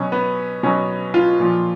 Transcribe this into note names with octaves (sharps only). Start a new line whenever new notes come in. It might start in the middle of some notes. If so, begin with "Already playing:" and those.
Already playing: B2 F#3 C#4
B3
B2 F#3 C#4
F4
A#2 F3